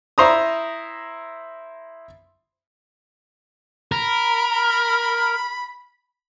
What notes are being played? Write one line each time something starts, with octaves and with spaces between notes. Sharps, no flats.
E4 C5 A#5 D#6
A#4 B5